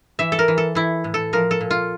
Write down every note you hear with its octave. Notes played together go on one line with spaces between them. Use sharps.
E3 E5
A4
A#4
E3
A4
E3 E4
A2
A4
F3 A#4
A4
A#2
F4